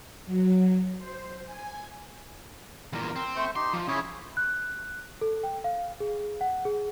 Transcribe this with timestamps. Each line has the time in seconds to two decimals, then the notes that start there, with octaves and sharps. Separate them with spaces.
0.26 F#3
0.98 C5
1.46 G#5
2.93 E2 A#2 A#4
3.16 C4
3.36 A3 C5 C#6
3.56 D#4 G4 C6
3.73 F3
3.88 C#3 E4 G#4 C#5
4.37 F#6
5.21 A4
5.43 G5
5.64 F5
6.00 G#4
6.41 F#5
6.65 G#4